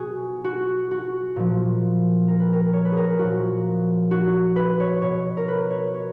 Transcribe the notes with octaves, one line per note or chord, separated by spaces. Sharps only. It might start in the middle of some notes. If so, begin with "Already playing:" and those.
Already playing: B2 F#4 G#4
F#4
F#4
A#2 F3
A#4
B4
A#4
C#5
B4
G#4 A#4
A#2 F3 F#4
F#4
B4
C#5
B2 C#5
A#4
B4
C#5
C#5